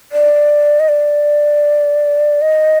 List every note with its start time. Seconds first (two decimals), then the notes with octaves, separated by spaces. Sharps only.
0.12 D5
0.80 D#5
0.89 D5
2.42 D#5